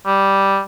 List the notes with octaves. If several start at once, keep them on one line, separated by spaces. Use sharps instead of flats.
G3